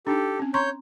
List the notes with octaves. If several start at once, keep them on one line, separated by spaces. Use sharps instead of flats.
D4 D#4 G4 A4
C4 C#4
C#5 A#5 C6 C#6 G6